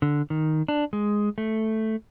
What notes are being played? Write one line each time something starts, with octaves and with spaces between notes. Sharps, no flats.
D3
D#3
D4
G#3
A3